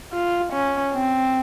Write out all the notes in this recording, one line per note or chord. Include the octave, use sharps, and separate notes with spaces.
F4
C#4
C4